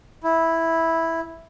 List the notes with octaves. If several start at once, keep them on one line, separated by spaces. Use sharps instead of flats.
E4